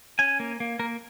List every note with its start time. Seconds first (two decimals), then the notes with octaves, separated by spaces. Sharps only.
0.19 C#4 G#5
0.40 A#3
0.60 A#3
0.79 A#3 A#4